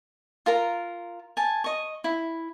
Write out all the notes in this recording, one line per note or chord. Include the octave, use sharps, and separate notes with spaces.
F4 A#4 A#5
G#5 A5
D#5 C#6
E4